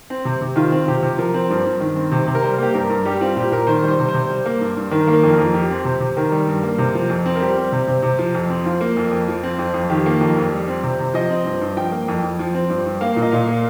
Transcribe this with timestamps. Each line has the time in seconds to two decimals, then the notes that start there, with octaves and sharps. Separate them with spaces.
0.10 C4
0.25 C3
0.41 C3
0.56 D#3 F4
0.72 C4
0.88 C3 G4
1.02 C3
1.18 F3 A#4
1.34 C4
1.50 G2
1.65 G2
1.80 D#3
1.96 C4
2.12 C3
2.27 C3
2.35 A#4
2.42 G3 C5
2.58 A#3 G4
2.74 G2 A#4
2.89 G2
3.05 G3 G4
3.21 C4 F4
3.36 A#2 G4
3.52 A#2 A#4
3.67 D#3 C5
3.83 G3
3.88 C5
3.99 C3
4.08 C5
4.14 C3
4.30 G3
4.46 A#3
4.61 G2
4.77 G2
4.91 D#3 A#4
5.08 A#3
5.13 A#4
5.23 F2
5.33 F2 A#4
5.54 F3 G4
5.70 C4
5.85 C3
6.00 C3
6.17 D#3 A#4
6.31 G3
6.47 G2
6.63 A#3
6.78 C3
6.95 F3
7.10 F2
7.26 C4
7.35 A#4
7.40 G3 G4
7.57 C4
7.72 C3
7.87 C3
8.03 C3
8.19 F3
8.35 F2
8.50 C4
8.65 F3 F4
8.81 A#3
8.96 F2
9.11 F2
9.28 F3
9.43 C4
9.59 F2
9.74 F2
9.90 D#3 G4
10.06 A#3
10.21 F2
10.37 F2
10.52 G3
10.68 C4
10.83 C3
10.99 C3
11.14 F3 D#5
11.30 C4
11.45 G2
11.61 G2
11.76 F3 G5
11.92 A#3
12.08 F2
12.23 F2
12.39 F3
12.55 C4
12.70 G2
12.86 G2
13.01 A#3 F5
13.16 A#2
13.22 D#5
13.32 A#2 F5
13.48 A#3